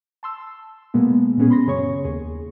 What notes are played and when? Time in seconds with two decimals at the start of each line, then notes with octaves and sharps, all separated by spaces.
0.23 A5 C6 E6
0.94 B2 G#3 A#3 B3
1.37 A#2 G#3 B3 C#4 G#4
1.50 B5 C6 A#6
1.66 F#2 C#3 G#4 C#5 C#6
2.05 D#2 G#4